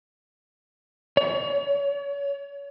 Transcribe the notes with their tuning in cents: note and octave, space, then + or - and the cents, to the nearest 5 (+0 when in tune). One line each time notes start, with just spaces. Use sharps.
C#5 +35